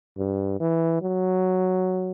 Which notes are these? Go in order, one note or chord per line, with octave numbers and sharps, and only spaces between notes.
G2
E3
F#3